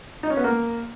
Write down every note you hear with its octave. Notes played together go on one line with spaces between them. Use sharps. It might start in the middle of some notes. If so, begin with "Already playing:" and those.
D#4
C#4
B3
A#3